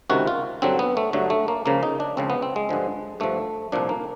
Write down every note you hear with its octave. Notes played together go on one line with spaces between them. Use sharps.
C#2 C3 D#3 F#4
F4
G2 D3 F#3 C4
B3
A3
G2 D3 F#3 A3
A3
A#3
C#2 C#3 F3 A#3
D#4
D4
C#2 C#3 F3 C4
B3
C4
G#3
G2 D3 F3
G2 D3 F3 A3
C2 A#2 F3 D4
A#3